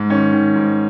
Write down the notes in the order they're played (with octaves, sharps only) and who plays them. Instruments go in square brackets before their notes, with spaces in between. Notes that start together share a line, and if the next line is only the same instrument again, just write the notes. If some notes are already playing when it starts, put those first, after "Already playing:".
Already playing: [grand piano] G#2
D#3 C#4
D#3
G#2